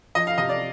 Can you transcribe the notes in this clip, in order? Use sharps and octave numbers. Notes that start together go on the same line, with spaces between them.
F3 D#5
F5
C3 D#5
D5